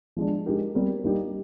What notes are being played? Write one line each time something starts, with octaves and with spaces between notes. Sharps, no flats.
F3 G#3 D4
G#3 D#4 G4 A#4
G3 C4 G4 A#4
G3 A#3 D#4 G4